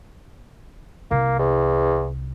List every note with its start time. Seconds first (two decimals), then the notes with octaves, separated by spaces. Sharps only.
1.11 C2 A#3
1.39 E2